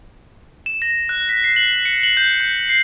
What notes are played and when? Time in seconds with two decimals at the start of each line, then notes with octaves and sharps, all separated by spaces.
0.66 E7
0.82 A#6
1.09 F#6
1.29 B6
1.44 C7
1.56 F#7
1.85 C#7
2.03 F#7
2.17 G6
2.40 G6
2.69 C7